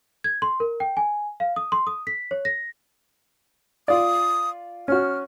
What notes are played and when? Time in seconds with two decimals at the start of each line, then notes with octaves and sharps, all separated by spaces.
0.24 G#6
0.42 C6
0.60 A#4
0.80 G5
0.97 G#5
1.40 F5
1.56 D#6
1.72 C6
1.87 D#6
2.07 B6
2.31 C#5
2.45 A#6
3.88 F4 D5 D#6
4.88 C#4 F#4 F6